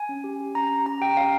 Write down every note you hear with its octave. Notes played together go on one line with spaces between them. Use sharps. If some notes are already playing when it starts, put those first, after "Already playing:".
Already playing: G#5
C#4
G4
G4
C#4 A#5
C#4
G4 A#5
G4 G5
G5
C#4 F5